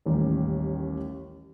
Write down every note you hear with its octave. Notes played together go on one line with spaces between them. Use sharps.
A1 D#2 G3